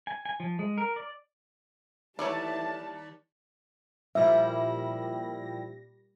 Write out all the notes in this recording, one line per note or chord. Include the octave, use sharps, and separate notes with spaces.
G#5
G#5
F3
G#3
A#4
D5
D#2 E3 G3 A3 E4 C#5 D5 A5
A#2 F3 G3 E4 E5 A#6